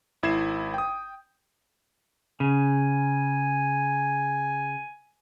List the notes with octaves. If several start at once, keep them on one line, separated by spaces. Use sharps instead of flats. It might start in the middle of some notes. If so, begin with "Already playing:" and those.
G#1 E4 G#6 C7 E7
G5 D#6
C#3 G#5